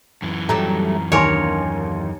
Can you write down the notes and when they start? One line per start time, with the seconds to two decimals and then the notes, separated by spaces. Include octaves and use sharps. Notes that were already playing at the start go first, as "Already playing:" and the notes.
0.22 F#2 E3
0.49 F#3 G3 A3 A#5
1.12 D#2 D4 A#4 C#5 G#5 C6